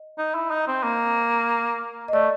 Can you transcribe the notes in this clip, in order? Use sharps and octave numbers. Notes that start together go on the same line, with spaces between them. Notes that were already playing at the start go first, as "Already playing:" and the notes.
Already playing: D#5
D#4
E4
D#4
C4
A#3
D#5
A3 D5